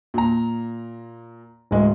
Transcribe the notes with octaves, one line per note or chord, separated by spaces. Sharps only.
A#2 A#5
D1 G#3